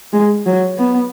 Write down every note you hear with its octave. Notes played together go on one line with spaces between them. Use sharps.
G#3
F#3
B3